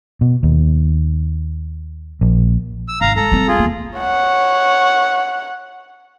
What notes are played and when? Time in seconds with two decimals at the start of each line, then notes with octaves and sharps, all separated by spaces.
0.21 B2
0.43 D#2
2.21 A#1
2.88 E6
3.01 G#1 F5 A#5
3.16 G#3 A4 A#5
3.32 G3 C4
3.48 F4 G#4
3.59 E2 A#3
3.99 C#5 F#5